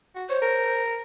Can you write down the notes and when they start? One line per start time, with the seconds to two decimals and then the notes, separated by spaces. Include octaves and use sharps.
0.15 F#4
0.29 C5 C#5
0.42 A#4